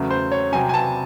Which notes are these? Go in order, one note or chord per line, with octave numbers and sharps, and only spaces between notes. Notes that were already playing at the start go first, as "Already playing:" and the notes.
Already playing: E2 C#3 F#3 A3
C5
C#5
C3 F#3 C4 G#5
G#5
A5